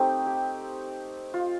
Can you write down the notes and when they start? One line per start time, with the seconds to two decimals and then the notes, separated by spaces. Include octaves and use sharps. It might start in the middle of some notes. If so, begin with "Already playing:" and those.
Already playing: A3 C4 D#4 G4
0.26 G4
1.34 F4